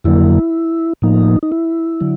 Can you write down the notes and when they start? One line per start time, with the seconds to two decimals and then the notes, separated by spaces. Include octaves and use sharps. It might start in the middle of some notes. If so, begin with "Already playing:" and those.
0.04 F2 D3 F#3 A#3 E4
1.02 A2 F3 A#3 D#4
1.43 D#4
1.52 E4
2.01 D3 F#3